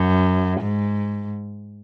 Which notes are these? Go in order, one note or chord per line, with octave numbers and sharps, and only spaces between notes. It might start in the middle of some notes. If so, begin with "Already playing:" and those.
Already playing: F#2
G#2